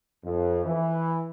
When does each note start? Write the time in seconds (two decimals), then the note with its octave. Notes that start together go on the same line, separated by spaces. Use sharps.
0.24 F2
0.65 E3